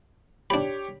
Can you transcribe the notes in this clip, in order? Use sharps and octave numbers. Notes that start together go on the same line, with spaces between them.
D4 G4 C#5 B5